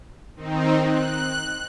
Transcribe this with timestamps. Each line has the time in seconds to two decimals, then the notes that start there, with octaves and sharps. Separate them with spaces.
0.36 D#3 C4 D#4
0.85 F#6